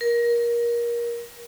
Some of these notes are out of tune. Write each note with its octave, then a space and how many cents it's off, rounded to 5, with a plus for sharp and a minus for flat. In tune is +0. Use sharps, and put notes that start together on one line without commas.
A#4 +25